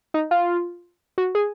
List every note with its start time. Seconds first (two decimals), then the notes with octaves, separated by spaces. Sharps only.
0.14 D#4
0.31 F4
1.18 F#4
1.35 G#4